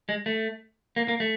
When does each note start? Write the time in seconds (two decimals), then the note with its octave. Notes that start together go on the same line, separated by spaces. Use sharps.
0.09 G#3
0.26 A3
0.96 A#3
1.08 A#3
1.20 A3